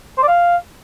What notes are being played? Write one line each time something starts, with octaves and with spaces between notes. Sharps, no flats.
C5
D5
F5